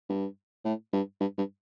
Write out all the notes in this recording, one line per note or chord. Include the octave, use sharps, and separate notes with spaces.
G2
A2
G2
G2
G2